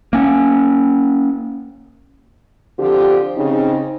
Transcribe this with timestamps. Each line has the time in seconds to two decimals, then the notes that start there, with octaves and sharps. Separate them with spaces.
0.13 A#3 C#4
2.78 D3 F3 C4 F4 G4
3.36 C#3 C4 D#4